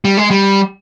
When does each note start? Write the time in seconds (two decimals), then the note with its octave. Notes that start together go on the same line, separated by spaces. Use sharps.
0.05 G3
0.17 G#3
0.31 G3